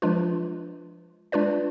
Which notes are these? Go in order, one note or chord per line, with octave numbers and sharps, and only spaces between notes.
F3 G#3 D4 F4 B4
G#3 D4 F4 B4 D5